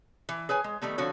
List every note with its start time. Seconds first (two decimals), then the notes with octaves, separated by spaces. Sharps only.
0.29 E3
0.49 G#4 B4 C#5 G#5
0.64 G#3
0.82 D#3 G3 A3 B3
0.98 D3 F3 C4 F#4 C#5